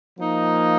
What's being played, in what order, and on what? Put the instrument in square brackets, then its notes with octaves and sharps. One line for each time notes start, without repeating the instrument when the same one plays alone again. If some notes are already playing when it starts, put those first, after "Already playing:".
[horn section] F3 A#3 D#4